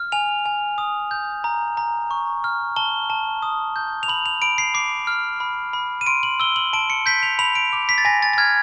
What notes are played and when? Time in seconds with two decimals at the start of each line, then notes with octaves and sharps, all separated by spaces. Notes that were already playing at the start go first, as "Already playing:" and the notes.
Already playing: F6
0.12 G#5 F7
0.46 G#5
0.78 D#6
1.11 G6
1.44 A#5
1.77 A#5
2.11 C#6
2.44 F6
2.76 A5 G7
3.10 A5
3.42 D#6
3.76 G6
4.03 F7
4.08 B5 F#7
4.26 F7
4.42 B5 D7
4.58 C7
4.74 D6 C7
5.07 F6
5.40 B5
5.73 B5
6.01 D#7
6.06 C6 D7
6.23 F#7
6.40 E6 G7
6.56 F#7
6.73 A5 D7
6.90 C#7
7.06 G6 B6
7.23 F7
7.39 B5 F7
7.55 D7
7.73 D6
7.89 B6
7.98 A6
8.05 G#5 A#6
8.23 A6
8.33 A6
8.38 F6 G#6